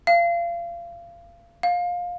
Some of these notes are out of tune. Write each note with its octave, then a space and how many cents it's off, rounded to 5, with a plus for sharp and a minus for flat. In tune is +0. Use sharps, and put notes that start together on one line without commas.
F5 -30
F5 +20